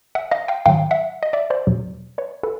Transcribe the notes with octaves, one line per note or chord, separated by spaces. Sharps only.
E5 F#5
D#5 F5
F5 G5
G#2 D#3 F#3 F5 G5
E5 F#5
D#5
D5 E5
C5 D5
E2 B2 F#3
B4 C#5
A4 B4